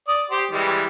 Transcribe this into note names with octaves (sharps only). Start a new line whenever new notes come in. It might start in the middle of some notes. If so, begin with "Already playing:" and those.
D5 D#6
G4 C5
E3 G3 G#3